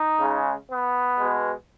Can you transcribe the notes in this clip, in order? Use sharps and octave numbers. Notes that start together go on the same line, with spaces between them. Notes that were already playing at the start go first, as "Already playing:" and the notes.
Already playing: D#4
C#3 G#3
B3
B2 G#3